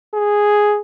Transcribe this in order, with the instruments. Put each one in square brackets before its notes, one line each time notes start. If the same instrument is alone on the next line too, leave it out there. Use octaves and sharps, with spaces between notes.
[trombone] G#4